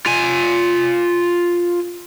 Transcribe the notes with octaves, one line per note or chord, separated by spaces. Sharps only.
F4 G#5